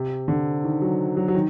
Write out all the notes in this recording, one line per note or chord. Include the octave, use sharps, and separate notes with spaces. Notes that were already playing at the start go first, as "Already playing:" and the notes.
Already playing: C3
D3
D#3
F#3
F#3
F#3
D#3